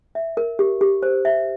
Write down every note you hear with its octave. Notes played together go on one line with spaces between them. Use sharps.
E5
A#4
G4
G4
C5
E5